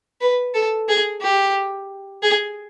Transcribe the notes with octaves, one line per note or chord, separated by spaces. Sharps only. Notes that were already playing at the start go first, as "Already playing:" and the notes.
B4
A4
G#4
G4
G#4